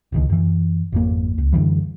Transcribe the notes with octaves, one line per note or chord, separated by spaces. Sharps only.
D#1 C#2 D#3
F#2 E3
G#1 F2 A#3
C#2
F#2 D3 E3 G3